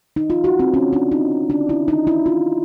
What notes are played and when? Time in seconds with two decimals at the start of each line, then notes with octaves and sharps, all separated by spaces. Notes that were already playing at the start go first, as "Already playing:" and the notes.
0.16 D#4
0.30 F4
0.44 F#4
0.59 C4
0.74 C#4
0.93 D4
1.12 D#4
1.50 D4
1.69 E4
1.88 D#4
2.07 E4
2.26 F4